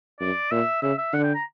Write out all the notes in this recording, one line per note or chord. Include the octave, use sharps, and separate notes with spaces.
F#2 D5
A#2 E5
C#3 E5
E5
D3 F#5
G5
A#5